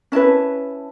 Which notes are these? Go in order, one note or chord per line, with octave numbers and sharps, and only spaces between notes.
C#4 E4 B4 A5